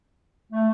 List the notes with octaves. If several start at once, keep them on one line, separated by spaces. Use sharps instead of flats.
A3